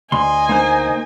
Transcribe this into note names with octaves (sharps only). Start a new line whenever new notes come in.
D2 D#5 G#5 C6
A#3 D#4 C5